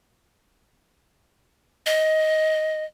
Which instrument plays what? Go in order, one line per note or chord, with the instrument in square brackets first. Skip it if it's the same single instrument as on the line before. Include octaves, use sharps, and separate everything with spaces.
[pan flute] D#5